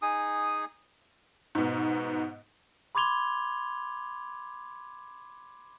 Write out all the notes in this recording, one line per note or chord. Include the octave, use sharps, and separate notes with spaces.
D#4 G#4 G#5 D#6
G#2 B2
B5 C6 D6 G#6 F7 G7